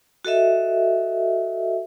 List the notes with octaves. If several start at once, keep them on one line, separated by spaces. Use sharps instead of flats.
F#4 A4 D#5 E5